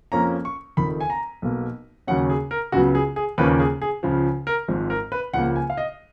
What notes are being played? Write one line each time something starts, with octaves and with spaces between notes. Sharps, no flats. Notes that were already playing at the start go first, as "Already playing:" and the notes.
F2 F3 A#3 C#4 A#5
C#6
F1 F2 D#3 B5
G#5
A#5
B1 B2 A#3
D#2 C#3 F#3 C#4 F#5
G#4
A#4
C#2 C#3 F#3 B3 F#4
G#4
G#4
D#2 C#3 F3 A#3 C#4 B4
G#4
G#4
C#2 C#3 F3
A#4
G#1 G#2 F3
A#4
B4
C#2 C#3 F3 A#3 F#5
G#5
F5
D#5